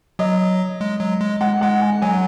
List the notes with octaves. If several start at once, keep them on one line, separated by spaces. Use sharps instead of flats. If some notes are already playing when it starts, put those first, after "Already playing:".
F#3 D#5
G#3
F#3
G#3
G#3 F#5
G#3 F#5
G#5
F#3 G#5